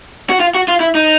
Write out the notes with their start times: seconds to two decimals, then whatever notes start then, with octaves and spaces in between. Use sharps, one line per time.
0.30 F#4
0.40 F4
0.55 F#4
0.68 F4
0.80 E4
0.95 D#4